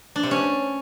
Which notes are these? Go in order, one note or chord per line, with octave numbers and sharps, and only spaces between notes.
D4
C3
C#4